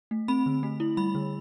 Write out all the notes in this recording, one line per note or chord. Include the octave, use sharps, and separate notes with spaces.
A3
C4 B5
D3
A3
E4
G3 B5
D3